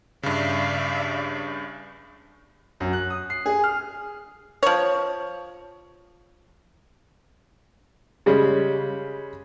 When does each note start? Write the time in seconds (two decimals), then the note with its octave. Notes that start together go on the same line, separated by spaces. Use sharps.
0.23 G2 C#3 D5 E5 F5
2.80 F#2
2.93 F#6
3.10 D#6
3.30 C7
3.46 G#4
3.64 F6
4.63 F3 C#5
8.26 C#3 G3 G#3 C#4